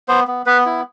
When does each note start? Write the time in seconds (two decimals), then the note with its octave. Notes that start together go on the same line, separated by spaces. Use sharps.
0.08 B3 C5
0.28 B3
0.46 B3 B4
0.66 E4